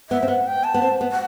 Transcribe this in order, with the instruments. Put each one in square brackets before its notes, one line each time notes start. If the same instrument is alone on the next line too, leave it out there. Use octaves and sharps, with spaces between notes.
[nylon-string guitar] B3 [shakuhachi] E5
[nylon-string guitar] C4
[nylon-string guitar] B3 [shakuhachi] F#5
[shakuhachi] G5
A5
[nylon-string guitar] B3
C4
B3
[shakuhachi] F#5